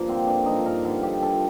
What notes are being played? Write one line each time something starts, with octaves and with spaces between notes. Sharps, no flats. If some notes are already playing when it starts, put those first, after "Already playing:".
Already playing: G2 F3 A#3
D3 C4
G2 D4
F3 D#4
G2 A#4
D3 A4
G2 G4
F3 A4